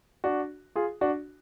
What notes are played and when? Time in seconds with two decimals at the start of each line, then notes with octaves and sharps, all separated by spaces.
0.24 D4 F#4
0.75 F4 G#4
1.01 D4 F#4